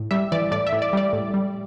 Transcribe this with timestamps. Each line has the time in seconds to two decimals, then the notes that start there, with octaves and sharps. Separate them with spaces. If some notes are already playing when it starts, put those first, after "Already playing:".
Already playing: A2
0.11 G3 E5
0.32 E3 D5
0.52 A2 D5
0.67 E5
0.73 A2
0.82 D5
0.93 G3 D5
1.13 A2
1.34 G3